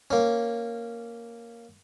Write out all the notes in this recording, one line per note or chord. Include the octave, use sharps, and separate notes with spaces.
A#3 C#4